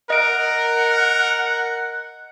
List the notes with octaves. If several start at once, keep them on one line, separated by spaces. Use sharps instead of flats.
A#4 D#5 F#5 D7